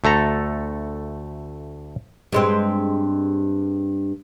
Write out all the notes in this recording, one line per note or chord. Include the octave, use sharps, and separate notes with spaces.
D2 A3 A4 A#5
G2 G#3 C4